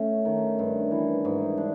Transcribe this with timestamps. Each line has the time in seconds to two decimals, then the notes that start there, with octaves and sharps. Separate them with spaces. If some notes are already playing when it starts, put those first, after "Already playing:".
Already playing: A3 C#4
0.25 D#3
0.59 G2
0.91 E3
1.25 G#2
1.57 D4